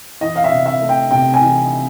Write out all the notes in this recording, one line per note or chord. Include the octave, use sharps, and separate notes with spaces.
E3 D#5
F5
E5
C3
E5
A3
G5
C3 G5
G#5
E3